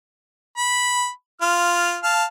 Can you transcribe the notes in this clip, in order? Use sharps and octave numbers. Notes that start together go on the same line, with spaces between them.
B5
F4 F6
F5 A5